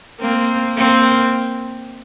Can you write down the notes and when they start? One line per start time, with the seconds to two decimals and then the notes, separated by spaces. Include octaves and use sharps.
0.20 A#3 C4
0.78 A#3 C4